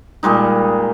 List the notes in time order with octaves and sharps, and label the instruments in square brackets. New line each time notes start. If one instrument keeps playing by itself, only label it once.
[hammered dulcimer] A#2 G3 G#3 D#4